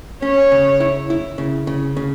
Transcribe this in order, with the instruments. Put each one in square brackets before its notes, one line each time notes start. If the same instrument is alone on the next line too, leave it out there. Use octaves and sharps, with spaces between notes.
[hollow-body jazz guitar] C#4 [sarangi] C#5
[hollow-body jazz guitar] C#3
E4
E4
C#3
C#3
C#3